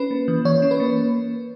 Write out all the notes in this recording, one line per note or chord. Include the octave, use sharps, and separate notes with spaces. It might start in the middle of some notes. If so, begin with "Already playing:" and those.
Already playing: C#4 B4
A#3
E3
E3 C#5
C#4
B4
A#3